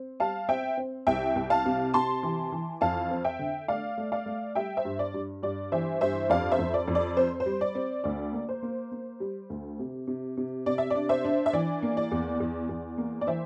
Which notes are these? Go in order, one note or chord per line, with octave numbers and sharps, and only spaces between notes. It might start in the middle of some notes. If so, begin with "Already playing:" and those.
Already playing: C4
G3 F5 A5
C4 E5 G5
C4
C2 E5 G5
C2
F5 A5
C3
C3 A5 C6
E3
E3
F2 F5 A5
C4
E5 G5
D3
A3 D5 F5
A3
D5 F5
A3
G3 E5 G5
C5 E5
G2
D5
G2
G2 D5
E3 C5 E5
G2 C5 E5
F2 D5 F5
C5 E5
F2
D5
F2
D5
C4 C5
C5
G3
D5
C4
D2 D5
A#3
C5
A#3
A#3
G3
D2
C3
C3
C3
C3 D5
E5
D4 D5
C5 E5
D4
E5
E3 D5
A#3
D5
E2
E2
E2
A#3
D5
E3 C5 E5